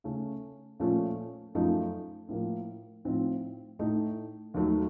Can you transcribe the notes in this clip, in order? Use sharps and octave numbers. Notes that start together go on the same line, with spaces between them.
C#3 A3 C#4
A#2 F3 A3 C#4
F#2 F3 A3 D#4
A2 F3 A#3
A2 F3 C4 D#4
A2 A3 D#4
D#2 D#3 F#3 A3